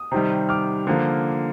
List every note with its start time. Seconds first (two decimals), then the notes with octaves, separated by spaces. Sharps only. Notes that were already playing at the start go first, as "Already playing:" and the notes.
Already playing: D#6
0.12 C3 D#3 G3
0.49 D6 F6
0.87 D3 F3 A#3